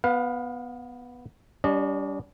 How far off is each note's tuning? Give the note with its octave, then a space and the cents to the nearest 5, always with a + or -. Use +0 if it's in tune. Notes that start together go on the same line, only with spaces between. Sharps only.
B3 +0 B4 +0 F5 +30
G3 +0 D4 -45 D#5 -40